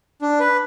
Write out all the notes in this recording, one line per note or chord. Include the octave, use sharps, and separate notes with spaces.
D4
B4